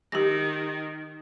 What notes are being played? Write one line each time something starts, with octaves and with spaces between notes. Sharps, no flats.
D#3 G4 A#6